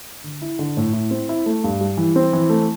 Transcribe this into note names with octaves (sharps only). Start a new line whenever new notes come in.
D3
E4
D3
A2
E4
C4
E4
A3
G2
G3
E3
C4
E3
A3